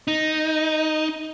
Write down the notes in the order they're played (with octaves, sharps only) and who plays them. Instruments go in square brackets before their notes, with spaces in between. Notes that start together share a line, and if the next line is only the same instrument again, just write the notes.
[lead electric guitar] D#4